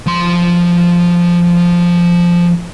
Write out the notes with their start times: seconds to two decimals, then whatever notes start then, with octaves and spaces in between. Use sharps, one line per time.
0.06 F3 C6